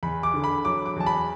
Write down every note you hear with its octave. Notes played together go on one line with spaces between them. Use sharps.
E2 B5
D6
D3
B5
F#3 D6
D6
E2 A5
B5